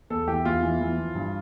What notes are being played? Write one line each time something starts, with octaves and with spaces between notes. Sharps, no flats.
E2 A4
E3 G4
E2 F4
E3
E3
F3
G2